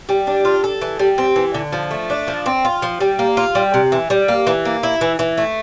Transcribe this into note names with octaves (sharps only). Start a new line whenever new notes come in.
G3
D4
F4
A4
E3
G3
C4
E3
D3
F3
A3
D4
F3
C4
F4
F3
G3
A#3
F4
G3
C3
E3
G3
A#3
E3
A#3
E4
E3
E3
A3